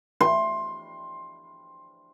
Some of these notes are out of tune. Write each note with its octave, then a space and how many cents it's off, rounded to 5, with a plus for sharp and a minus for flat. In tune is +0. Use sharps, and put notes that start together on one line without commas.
C6 +15